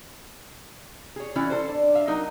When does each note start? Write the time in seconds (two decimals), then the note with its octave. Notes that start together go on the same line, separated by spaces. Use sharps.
1.16 G#4 C#5
1.35 E3 C#4 E4 F#4 D5
1.50 A4 C5
1.69 D4
1.95 E5 F5
2.07 F#3 D#4 A#4